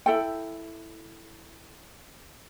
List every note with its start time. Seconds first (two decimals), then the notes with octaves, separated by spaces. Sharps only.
0.06 E4 A4 G5